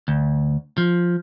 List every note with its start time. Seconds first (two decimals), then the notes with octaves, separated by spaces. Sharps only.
0.08 D2
0.78 F3